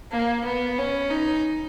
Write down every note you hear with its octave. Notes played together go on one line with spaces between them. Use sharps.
A#3
B3
C#4
D#4